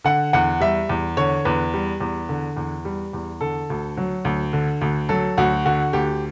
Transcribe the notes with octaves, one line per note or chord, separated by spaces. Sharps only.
D3 F#5
E2 F#5
G3 E5
E2
D3 C#5
E2 B4
G3
E2
D3
E2
G3
E2
D3 A4
D2
F#3
D2
D3
D2
F#3 A4
D2 F#4
D3 F#4
D2 G4